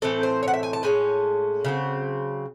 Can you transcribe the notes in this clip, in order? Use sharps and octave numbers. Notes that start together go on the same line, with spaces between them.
A2 E3 C4 A4
C5
C#5
F#5
E5
G#5
A5
A2 G#3 C#4 G#5
C#3 F#3 C4